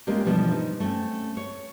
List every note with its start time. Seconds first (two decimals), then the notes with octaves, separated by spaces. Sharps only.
0.07 G#3 A#3 B3 C#4 F4 G4
0.25 B2 D3 E3 F3 G3 B3
0.52 D#4
0.80 A3 C4 C#4
1.37 C#5